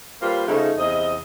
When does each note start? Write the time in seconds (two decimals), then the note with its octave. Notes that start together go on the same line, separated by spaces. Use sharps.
0.22 G3 A#3 F4 B4 C5
0.47 C#3 F3 A3 D#4
0.78 E2 C3 D#5